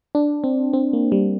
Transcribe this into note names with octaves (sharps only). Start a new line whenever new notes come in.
D4
C4
C4
A#3
G3